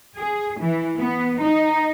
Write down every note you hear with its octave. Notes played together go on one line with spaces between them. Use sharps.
G#4
E3
B3
D#4